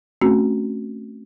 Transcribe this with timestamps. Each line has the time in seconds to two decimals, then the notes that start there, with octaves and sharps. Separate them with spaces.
0.21 A3 C4 C#4 F#4